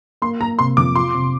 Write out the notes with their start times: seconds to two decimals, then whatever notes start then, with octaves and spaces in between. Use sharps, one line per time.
0.22 A#3 C6
0.40 A#3 A#5
0.59 C3 C6
0.77 F2 D6
0.95 F4 C6
1.14 C3